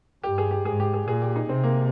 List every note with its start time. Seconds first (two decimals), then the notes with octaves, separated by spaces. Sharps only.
0.23 G2 G4
0.38 G#4
0.51 G4
0.65 G#2 G#4
0.80 G4
0.94 G#4
1.07 A#2 G#4
1.22 G4
1.36 D#4
1.49 C3 C4
1.63 A#3